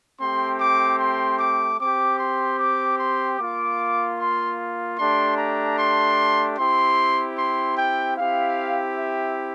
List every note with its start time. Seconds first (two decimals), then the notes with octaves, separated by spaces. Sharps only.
0.19 A3 C4 G4 C6
0.60 D6
0.99 C6
1.39 D6
1.79 C4 G4 D6
2.19 C6
2.60 D6
2.99 C6
3.39 A#3 F4 D6
4.19 C6
4.98 A3 D4 G4 C6
5.38 A#5
5.78 C6
6.57 C4 E4 G4 C6
7.38 C6
7.77 G5
8.17 C4 E4 G4 F5
8.98 E5